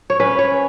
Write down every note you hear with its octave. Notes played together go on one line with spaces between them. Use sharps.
C#5
C#4 B4
C#5